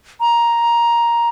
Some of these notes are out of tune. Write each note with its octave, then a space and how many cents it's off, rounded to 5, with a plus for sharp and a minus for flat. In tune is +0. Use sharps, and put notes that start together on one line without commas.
A#5 +10